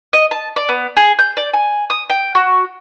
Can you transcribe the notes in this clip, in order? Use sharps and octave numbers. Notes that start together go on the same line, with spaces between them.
D#5
A5
D5
B3
G#4
G6
D5
G#5
D#6
G5
F#4